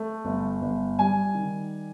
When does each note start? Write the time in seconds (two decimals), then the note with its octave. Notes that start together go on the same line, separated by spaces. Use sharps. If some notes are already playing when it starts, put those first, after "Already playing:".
Already playing: A3
0.25 G1
0.62 G1
0.98 G3 G#5
1.35 D#3